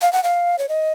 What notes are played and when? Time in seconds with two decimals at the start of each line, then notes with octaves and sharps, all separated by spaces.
0.01 F5
0.13 F#5
0.24 F5
0.59 C#5
0.69 D#5